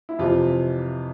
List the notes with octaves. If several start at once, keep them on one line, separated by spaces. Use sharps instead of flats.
E4
F2 C3 E3 F4